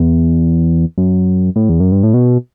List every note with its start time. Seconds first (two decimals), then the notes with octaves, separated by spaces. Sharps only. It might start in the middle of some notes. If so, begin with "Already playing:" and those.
Already playing: E2
0.98 F#2
1.56 A2
1.69 E2
1.80 F#2
1.92 G2
2.03 A2
2.14 B2